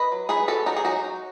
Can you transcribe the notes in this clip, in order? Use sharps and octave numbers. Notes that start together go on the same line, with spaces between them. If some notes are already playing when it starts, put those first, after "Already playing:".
Already playing: B4 D#5
F#3
D#4 G#4 B4
B3 F#4 A4
F#3 D#4 F#4
G#4
F#3 D#4 F#4
D#4